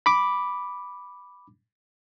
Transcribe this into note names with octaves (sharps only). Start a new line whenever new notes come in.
B5 D6